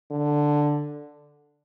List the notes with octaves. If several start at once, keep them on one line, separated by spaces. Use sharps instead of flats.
D3